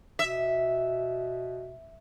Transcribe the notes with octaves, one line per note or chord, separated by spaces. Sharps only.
B2 E5